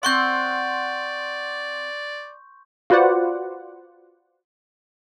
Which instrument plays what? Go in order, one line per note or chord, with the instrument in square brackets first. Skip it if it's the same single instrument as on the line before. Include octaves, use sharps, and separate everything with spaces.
[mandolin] C4 F#5 [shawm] D5 [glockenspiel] C6 C#6 G6
[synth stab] F4 F#4 B4 C5 D5 F#5